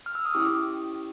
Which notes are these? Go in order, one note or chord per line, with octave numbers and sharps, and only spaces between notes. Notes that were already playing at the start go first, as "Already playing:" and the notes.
F6
E6
D#6
C#4 E4 G4 D6